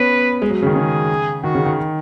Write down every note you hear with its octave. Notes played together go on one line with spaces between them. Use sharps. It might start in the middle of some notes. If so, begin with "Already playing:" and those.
Already playing: B3 C#4 B4
G#3
F#3
C#3
D#3
C#3 G#4
D#3 F#4
C#3
D#3